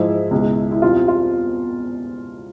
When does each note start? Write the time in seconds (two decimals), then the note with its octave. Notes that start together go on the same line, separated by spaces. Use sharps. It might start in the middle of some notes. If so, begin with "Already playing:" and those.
Already playing: G#2 F3 G#3 E4
0.31 C#2 B2 G#3
0.72 E4
0.82 E2 B2 G3 C4 F4
1.08 F4